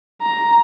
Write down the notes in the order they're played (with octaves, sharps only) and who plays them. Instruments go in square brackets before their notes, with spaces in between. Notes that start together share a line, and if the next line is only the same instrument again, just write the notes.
[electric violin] A#5